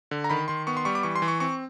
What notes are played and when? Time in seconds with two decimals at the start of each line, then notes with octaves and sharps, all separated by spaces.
0.11 D3
0.24 A#5
0.30 D#3 B5
0.48 D#3 C6
0.67 B3 C#6
0.77 C6
0.85 G3 C#6
0.95 D6
1.03 E3 C#6
1.16 C6
1.22 E3
1.28 C#6
1.40 C4 C#6